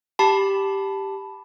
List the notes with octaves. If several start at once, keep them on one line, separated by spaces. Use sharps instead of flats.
G4 A5 B5